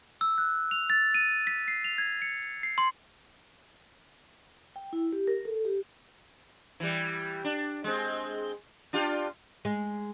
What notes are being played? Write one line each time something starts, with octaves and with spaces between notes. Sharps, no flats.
E6
F#6
F7
A6
D#7
B6
C7
F7
G#6
C#7
C7
C6
G5
E4
G4
A#4
A4
G4
E3 G3
D4
G#3 C4
D4 F4 G4
G#3